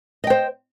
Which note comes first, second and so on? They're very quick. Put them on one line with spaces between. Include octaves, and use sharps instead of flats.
D#5 G5 C5